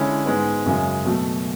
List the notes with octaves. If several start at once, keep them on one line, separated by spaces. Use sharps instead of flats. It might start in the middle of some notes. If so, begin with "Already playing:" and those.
Already playing: D3 G#3 C#4 E4
G#2 G#3 B3
F#2 C#3 G#3
B2 F#3 A3